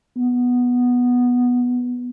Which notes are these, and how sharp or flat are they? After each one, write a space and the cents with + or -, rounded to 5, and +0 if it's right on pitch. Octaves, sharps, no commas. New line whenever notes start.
B3 -5